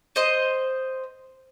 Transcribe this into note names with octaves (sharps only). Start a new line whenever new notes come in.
C5 D#5